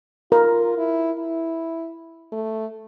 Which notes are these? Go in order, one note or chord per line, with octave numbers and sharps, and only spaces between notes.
F4 A#4
E4
E4
A3